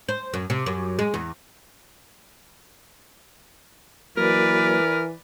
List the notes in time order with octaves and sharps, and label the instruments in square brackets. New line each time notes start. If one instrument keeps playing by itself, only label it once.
[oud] C5
F#2
C3
F#2
G#3
E2
[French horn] E3 [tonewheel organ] F#3 A#3 [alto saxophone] A#4 [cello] B4 D5